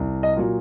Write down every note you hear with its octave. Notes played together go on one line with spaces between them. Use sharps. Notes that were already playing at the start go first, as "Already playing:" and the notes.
Already playing: C2
D#5
A#2 F#3